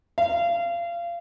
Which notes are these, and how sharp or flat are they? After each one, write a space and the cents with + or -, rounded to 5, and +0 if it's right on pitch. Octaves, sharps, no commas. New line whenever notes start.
F5 -25